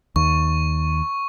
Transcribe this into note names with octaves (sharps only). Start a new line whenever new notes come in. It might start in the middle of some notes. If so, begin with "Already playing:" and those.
D#2 C#6